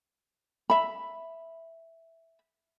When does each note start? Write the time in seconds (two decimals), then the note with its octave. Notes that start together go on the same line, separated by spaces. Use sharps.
0.70 E5 B5